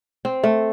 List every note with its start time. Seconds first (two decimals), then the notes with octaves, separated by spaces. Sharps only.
0.25 C4
0.43 A3